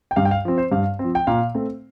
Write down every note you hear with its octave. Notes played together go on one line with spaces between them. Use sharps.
G5
G2 F5
G5
F5
F3 C4
C5
G2 F5
F3 C4
G5
A#2 F5
A3 C4